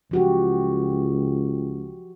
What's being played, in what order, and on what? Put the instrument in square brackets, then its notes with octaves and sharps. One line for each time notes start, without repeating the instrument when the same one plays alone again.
[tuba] C#2 [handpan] F3 F#4 G4